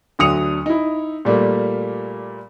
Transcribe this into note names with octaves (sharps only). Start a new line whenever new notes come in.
D2 D3 F#3 D#6 C#7 F7
D#4 E4
A#2 G3 A3 A#3